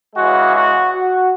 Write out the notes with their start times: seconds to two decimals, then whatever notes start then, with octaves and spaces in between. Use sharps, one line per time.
0.16 C#3 E3 G#3 F#4
0.55 F#4
0.94 F#4